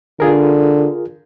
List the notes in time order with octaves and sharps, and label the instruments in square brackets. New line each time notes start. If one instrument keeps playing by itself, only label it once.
[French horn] D3 [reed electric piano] F4 G#4 A#4